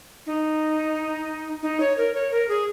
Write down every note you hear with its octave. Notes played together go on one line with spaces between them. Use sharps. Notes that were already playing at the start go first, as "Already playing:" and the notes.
D#4
D#4
C#5
A#4
C#5
A#4
G#4